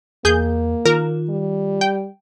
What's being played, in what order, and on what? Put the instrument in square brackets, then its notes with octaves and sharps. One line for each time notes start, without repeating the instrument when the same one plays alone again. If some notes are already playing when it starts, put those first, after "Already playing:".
[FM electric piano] E2 [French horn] A#3 [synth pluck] G#4 G6
[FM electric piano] D#3 F4 [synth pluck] A#4
[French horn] G3
[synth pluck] G5